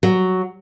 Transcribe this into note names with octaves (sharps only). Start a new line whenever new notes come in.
F#3